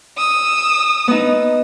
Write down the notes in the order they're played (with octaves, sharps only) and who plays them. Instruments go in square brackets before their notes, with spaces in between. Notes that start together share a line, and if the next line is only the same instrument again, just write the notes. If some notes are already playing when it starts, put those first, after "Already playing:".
[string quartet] D#6 E6
[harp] B3 D#4